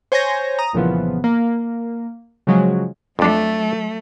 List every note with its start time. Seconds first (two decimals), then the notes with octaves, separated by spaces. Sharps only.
0.12 C5 C#5 G#5 G6 A#6
0.59 A#5 D#6
0.73 C2 A#2 C#3 E3 F3 B3
1.24 A#3
2.47 C#3 F3 F#3 G#3
3.19 F2 F#3 A3 D4